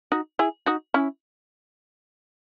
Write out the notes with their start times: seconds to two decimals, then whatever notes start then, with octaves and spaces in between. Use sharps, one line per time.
0.12 D#4 F#4
0.39 E4 G#4
0.66 D#4 F#4
0.94 C#4 E4